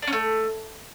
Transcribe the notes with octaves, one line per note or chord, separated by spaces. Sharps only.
D4
C#4
A3